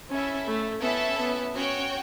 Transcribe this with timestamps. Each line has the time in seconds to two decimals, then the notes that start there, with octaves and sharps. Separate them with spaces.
0.10 C#4 E4 A4 E5
0.47 A3
0.82 B3 C#4 E4 A4 E5 A5
1.18 B3
1.55 C#4 F#4 C#5 G5